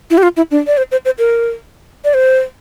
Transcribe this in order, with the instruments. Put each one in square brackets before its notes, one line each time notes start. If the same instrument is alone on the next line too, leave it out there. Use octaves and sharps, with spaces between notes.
[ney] E4
G4
F4
E4
D4
D5
C5
C5
C5
A#4
D5
C5